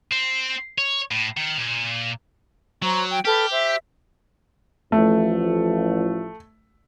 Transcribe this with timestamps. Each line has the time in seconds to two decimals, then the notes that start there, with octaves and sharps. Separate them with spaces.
0.12 C4
0.78 C#5
1.11 A2
1.37 D#3
1.58 A#2
2.82 F#3 C5 A#5 C#6
3.08 G5
3.25 G4 A4 B4 F6
3.51 C5 E5
4.92 A1 F3 A3